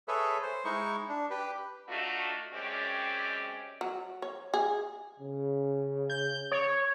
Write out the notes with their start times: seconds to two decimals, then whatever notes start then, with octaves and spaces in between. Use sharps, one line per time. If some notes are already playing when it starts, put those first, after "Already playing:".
0.08 G#4 A4 B4 C#5 E5
0.42 C5
0.65 G#3 D#4 E4 C#6
1.09 D4
1.30 G4 B4
1.88 A3 D4 D#4 F4 F#4
2.53 F#2 G#3 C4 C#4 G4 D5
3.81 F#3
4.22 C#5
4.54 G#4
5.19 C#3
6.10 G6
6.52 C#5